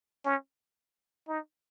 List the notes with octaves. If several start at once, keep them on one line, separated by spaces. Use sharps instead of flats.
C#4
D#4